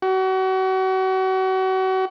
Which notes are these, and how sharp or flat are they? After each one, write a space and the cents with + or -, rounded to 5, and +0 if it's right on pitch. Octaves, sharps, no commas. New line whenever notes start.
F#4 +35